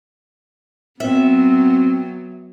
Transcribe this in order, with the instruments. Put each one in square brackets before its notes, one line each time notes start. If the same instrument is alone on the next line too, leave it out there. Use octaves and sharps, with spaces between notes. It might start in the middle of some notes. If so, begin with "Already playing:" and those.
[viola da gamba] F#3 B3 [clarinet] C4 [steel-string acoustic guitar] E5